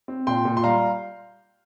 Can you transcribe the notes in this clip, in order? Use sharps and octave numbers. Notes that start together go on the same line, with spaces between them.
C4
A#2 G5 C6
A#2
C6
G3 F5 A#5